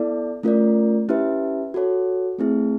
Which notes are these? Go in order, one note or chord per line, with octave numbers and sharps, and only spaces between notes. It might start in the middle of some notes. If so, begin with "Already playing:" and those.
Already playing: B3 E4 A4 D5
A3 C#4 F4 A#4 D5
C#4 E4 G4 B4 E5
F#4 A4 C#5
A3 C4 E4 G#4